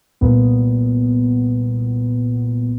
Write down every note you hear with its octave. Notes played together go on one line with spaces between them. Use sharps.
C2 A#2 B3